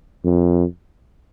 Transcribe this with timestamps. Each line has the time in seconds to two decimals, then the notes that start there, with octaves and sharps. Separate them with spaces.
0.24 F2